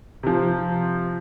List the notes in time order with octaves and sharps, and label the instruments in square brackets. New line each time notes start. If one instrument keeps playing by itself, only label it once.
[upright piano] C3 F3